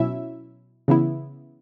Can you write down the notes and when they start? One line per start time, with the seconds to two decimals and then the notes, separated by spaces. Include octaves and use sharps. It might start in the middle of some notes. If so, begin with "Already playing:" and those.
Already playing: B2 F#3 C#4 E4 E5
0.88 C#3 E3 B3 E4